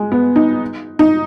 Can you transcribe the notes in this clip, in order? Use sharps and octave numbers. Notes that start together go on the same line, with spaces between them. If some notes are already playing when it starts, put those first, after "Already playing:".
Already playing: G#3
B3
D#4
D#4